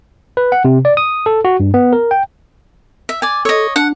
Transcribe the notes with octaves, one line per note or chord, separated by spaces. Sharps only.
B4
F#5
C3
D5
D#6
A4
F#4
G2
B3
A#4
G5
E5
D5 G#5
A4 C#5 D#5
D4 F#5